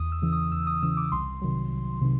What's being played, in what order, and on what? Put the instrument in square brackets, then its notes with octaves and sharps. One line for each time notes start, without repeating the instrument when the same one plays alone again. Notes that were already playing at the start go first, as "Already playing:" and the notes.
Already playing: [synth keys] E2 D#6
E6
C#3 E3
D#6
E2 E6
D#6
C#3 E3 E6
D6
C2 C6
C3 D#3 F#3
C2
C3 D#3